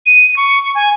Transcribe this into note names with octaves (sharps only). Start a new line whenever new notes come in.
D#7
C#6
G#5